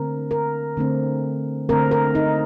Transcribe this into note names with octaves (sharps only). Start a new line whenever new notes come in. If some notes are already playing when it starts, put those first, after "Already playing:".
Already playing: D3 A3 C4 A#4
A#4
D3 A3 C4
D3 A3 C4 A#4
A#4
D#4